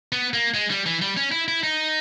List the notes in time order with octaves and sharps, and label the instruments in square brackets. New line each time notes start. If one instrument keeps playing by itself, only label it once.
[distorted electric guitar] B3
A#3
G#3
G3
E3
G3
C#4
E4
E4
D#4